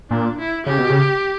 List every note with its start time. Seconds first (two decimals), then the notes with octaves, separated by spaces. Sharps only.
0.10 A#2 D4
0.39 E4
0.66 C#3 G4
0.78 B2
0.90 C#3